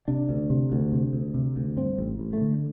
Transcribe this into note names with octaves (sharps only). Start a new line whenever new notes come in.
C3 D4
D2
C3
D2
C3
D2
C3
D2
G2 C4
A1
A1
A3
D3